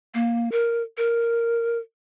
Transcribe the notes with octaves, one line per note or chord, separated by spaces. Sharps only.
A#3
A#4
A#4